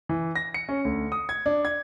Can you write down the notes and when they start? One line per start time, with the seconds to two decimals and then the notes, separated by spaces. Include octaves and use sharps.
0.09 E3
0.36 A#6
0.54 C#7
0.69 C#4
0.85 D2
1.12 D#6
1.29 G#6
1.46 D4
1.65 G#6